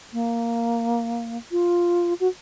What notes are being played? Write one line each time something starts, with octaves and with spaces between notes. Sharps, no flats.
A#3
F4
F#4